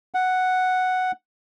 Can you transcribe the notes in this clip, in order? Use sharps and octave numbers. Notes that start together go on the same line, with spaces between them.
F#5